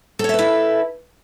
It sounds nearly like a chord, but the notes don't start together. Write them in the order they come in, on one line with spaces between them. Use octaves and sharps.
A4 C#5 E5 B4 E4